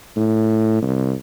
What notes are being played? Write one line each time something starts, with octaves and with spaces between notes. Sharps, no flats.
A2
C2